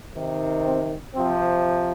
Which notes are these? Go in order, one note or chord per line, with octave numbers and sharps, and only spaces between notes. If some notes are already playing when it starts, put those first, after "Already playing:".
C3 D#3
C4
C3 F3 C4